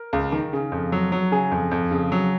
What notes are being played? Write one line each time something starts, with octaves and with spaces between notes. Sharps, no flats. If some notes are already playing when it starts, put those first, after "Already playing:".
Already playing: A#4
C#2
D#3
C#3
F2
F#3
F#3
C#3 G#4
F2
F2
C#3
F#3